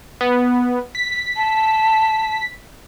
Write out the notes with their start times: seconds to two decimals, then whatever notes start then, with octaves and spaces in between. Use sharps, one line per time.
0.21 B3
0.95 B6
1.36 A5